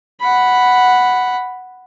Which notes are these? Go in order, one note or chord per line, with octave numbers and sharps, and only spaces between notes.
F#5 B5